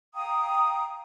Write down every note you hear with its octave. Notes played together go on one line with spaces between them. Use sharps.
F5 G5 A#5 D#6